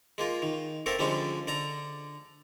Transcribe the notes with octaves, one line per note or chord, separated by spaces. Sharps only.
G#3 A#3 F4
D#3
A3 A#3 C4 A4 A#4
D3 F3 G3 G#3 C#4 D4
D3 D5 A#5